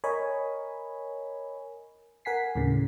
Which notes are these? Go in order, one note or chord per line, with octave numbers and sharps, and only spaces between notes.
A#4 C#5 D#5 G#5 B5
A#4 F#5 G#5 B6 C7
D#2 A2 C#3